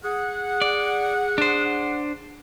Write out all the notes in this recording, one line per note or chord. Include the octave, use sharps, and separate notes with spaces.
G#4 F#5
D5
D4 C5